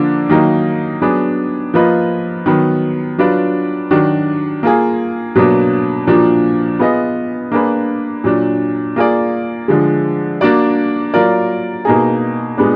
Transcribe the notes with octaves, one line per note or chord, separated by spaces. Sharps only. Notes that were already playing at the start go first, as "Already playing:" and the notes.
Already playing: D3 F3 A#3 D4
D#3 F#3 A#3 D#4
F#3 B3 D4 G#4
F3 A#3 F4 B4 D#5
D#3 F#3 B3
F#3 D4 F4 B4 D5
D#3 F#3 D4 F#4
A#3 F4 G#4
B2 F#3 A#3 D4
A#2 F3 A#3 D4 F#4
B3 F4 G#4 B4 D#5
A#3 D4 G#4 B4
A#2 F#3 D4
A#3 F4 G#4 D5
D3 F3 G#3
A#3 D4 F#4 D5
F#3 A#3 F4 A#4 D5
B2 A#3 D#4 G#4
A#2 G#3 B3 D4